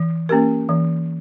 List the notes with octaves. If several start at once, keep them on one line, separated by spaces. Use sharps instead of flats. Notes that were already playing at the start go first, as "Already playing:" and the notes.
Already playing: E3
A#3 C#4 G4 A#4
E3